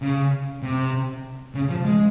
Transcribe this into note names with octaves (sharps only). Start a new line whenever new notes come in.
C#3
C3
C#3
F3
G#3